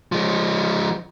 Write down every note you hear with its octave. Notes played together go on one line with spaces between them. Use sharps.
F3 G#3